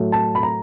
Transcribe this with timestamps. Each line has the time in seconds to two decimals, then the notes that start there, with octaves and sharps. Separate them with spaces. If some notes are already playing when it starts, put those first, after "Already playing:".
Already playing: A2 F#3 A3
0.12 A5
0.35 B5
0.43 A#5